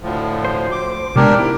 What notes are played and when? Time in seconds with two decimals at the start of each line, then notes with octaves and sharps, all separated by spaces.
0.02 D2 A2 F3
0.45 C5
0.72 D6
1.16 C3 G#3 B3 D4 G4 A#4
1.38 G#2 E4 G4